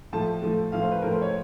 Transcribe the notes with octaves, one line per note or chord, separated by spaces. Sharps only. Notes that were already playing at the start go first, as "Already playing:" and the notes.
A2 F3 A3 A5
A2 F3 A3
A2 F3 A3 F5
C5
B4
A2 F3 A3 A#4
C5
C#5